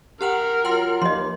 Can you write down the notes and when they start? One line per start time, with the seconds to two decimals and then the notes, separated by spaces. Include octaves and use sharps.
0.21 G4 A#4 F#5 G5
0.65 F#3 F4 G5 C6
1.02 D#2 F3 A#3 D#5 C6